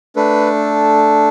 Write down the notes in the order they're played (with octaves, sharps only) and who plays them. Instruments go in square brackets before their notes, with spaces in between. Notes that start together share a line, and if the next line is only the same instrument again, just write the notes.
[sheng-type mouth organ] A3 D4 A4 B4